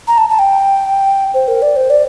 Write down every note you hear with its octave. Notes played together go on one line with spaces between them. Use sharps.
A#5
A5
A5
G5
C5
A#4
D5
C5
D5